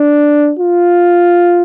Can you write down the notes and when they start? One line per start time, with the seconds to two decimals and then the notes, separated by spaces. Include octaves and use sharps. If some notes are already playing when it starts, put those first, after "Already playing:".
Already playing: D4
0.59 F4